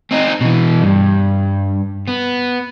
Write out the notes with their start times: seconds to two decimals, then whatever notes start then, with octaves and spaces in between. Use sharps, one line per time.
0.11 C4 D#4
0.41 B2 E3
0.82 G2
2.08 B3